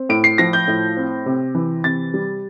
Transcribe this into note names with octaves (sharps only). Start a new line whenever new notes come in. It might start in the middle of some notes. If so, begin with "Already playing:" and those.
Already playing: C4
A2 D7
C7
F3 A#6
G6
A2
C4
C3
E3
C3 A6
G3